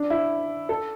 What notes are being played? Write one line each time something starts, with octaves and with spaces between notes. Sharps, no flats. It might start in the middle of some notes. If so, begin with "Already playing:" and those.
Already playing: D4
E4
A4